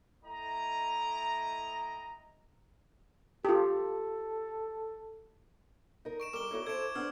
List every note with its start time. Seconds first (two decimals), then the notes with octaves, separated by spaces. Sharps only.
0.24 A3 E4 D#5 G5 A#5
3.45 F4 G4 A4
6.05 D#4 A#4
6.20 C#6 D7 E7
6.33 G3 A#4 D6 G7
6.51 D#4 E4 F#4 A4 C#5
6.67 E4 A4 C5 G#6 D7
6.95 B3 D4 C5 E6 F6